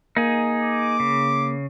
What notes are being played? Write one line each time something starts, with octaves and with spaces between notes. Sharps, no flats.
A#3 D#4 G#4
D6
C#3